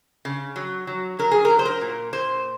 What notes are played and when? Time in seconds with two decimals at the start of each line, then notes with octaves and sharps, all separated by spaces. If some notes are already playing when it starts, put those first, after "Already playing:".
0.25 C#3
0.56 F#3
0.87 F#3
1.19 F#3 A#4
1.31 G#4
1.45 A#4
1.50 F#3
1.59 C5
1.65 A#4
1.81 A#2
2.13 A#2 C5